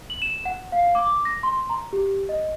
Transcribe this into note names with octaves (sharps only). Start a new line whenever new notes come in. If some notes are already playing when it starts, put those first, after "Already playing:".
F#7
E7
F#5
F5
D6
A#6
C6
A#5
G4
D#5